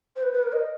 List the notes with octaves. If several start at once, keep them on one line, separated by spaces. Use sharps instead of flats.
C5
B4
B4
A#4
D#5